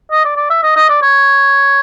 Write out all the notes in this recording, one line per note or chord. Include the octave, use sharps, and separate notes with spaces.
D#5
D5
D5
E5
D#5
D#5
D5
C#5